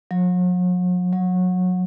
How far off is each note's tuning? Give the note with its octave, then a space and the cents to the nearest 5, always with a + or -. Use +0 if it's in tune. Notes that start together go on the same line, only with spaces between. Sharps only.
F#3 -45
F#3 -25